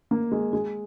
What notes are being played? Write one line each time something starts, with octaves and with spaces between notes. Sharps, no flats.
A#3
G#3
G#3